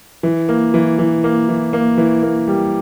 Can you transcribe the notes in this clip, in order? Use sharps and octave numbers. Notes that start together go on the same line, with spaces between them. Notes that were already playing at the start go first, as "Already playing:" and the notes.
E3
A#3
E3
E3
A#3
E3
A#3
E3
A#3
G3